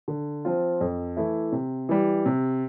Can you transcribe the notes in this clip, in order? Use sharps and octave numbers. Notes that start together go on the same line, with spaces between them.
D3
F3 C4 F4
F2
E3 A3 E4
C3
E3 G3
C3